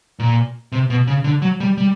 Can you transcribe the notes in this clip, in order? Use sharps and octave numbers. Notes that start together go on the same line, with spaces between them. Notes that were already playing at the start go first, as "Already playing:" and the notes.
A#2
C3
B2
C#3
D3
F#3
G3
G3